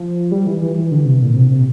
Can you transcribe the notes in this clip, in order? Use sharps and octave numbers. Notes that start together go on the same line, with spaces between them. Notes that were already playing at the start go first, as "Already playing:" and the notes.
Already playing: F3
G3
E3
E3
E3
D3
C3
A#2
C3
C3